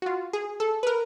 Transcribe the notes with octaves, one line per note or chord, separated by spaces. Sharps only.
F#4
F4
G#4
A4
B4
A#4